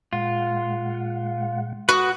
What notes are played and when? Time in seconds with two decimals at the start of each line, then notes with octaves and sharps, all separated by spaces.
0.13 A#2 G#3 F4 F#5
1.89 F#4 B4 D#6